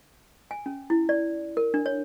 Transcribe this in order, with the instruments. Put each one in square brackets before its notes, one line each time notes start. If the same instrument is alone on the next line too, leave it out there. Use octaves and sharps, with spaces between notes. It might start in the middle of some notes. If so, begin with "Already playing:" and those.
[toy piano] G#5
C#4
E4
D5
A#4
D4
C#5